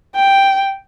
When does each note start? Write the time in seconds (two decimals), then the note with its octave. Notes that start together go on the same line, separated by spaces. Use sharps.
0.16 G5